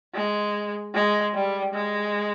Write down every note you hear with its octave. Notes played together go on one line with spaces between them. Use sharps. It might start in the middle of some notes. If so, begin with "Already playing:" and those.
G#3
G#3
G3
G#3